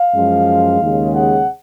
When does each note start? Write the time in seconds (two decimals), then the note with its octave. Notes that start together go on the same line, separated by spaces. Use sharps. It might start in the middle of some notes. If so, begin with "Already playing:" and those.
Already playing: F5
0.14 F#2 F3 G#3
0.81 D#2 C#3 G#3
1.14 F#5